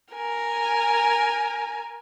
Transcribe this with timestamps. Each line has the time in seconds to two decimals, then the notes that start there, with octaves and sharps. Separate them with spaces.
0.14 A#4 G#5